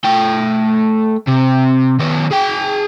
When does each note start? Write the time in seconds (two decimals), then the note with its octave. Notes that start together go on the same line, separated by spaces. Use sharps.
0.05 A3 G5
1.28 C3
1.99 D#3 B3
2.31 G#4 G5